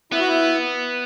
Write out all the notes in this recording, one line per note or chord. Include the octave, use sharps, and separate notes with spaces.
B3 E4
F#4
E4